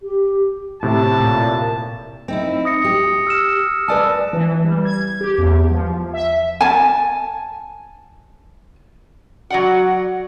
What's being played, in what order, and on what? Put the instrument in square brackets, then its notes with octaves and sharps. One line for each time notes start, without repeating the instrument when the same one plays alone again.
[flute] G4
[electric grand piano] A2 C3 [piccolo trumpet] A5
[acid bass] A#2
[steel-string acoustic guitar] C4 D#4 E4
[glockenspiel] D#6 A#6 C#7
[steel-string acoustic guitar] G4
[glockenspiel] E6 F6 E7
[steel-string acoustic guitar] B4 D5 G#5 [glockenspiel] A5 E6
[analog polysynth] E3
G3
G#6
G4
E2
F3
E5
[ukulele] G#5 A5
[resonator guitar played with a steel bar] F#3 D5 F#5 [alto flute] F#4